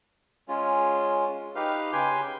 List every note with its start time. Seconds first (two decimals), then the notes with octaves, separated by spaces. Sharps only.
0.48 G#3 C#4 F4
1.55 D#4 G4 B4 F5
1.93 C#3 G4 B4 G5 G#5 C6